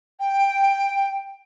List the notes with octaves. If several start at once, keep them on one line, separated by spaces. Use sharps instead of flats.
G5